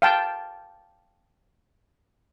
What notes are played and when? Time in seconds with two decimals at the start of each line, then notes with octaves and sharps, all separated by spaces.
0.02 F5 G5 A5